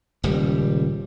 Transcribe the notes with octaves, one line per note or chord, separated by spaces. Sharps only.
D#1 C#2 G3